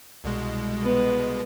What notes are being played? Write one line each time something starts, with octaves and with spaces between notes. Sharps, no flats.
C2 B2 G#3
B3